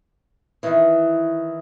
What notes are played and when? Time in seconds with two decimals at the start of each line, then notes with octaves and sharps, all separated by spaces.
0.63 D#3 E3